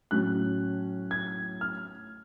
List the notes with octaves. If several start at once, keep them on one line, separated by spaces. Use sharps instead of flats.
A2 F#3 C#4 F#6
G#6
F6